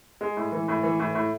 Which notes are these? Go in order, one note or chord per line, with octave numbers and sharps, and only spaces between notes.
G#3
A2
E3
A2
E3
A2
A2